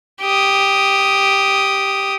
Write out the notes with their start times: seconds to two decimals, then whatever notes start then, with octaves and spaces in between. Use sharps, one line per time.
0.21 G4 D#6